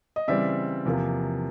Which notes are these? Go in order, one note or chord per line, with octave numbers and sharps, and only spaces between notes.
D#5
C#3 E3 G3 C4 D5 E5
E2 C3 F3 A#3